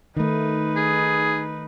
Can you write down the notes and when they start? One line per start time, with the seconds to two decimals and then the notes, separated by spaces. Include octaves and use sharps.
0.17 D#3 A3 D#4 B4
0.77 G#4